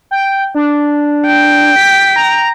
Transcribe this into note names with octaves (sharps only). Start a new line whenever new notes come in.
G5
D4
G5
B6
A#5